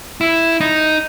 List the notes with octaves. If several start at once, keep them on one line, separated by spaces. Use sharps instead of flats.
E4
D#4